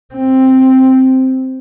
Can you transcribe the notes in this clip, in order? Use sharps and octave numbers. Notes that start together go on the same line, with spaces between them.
C4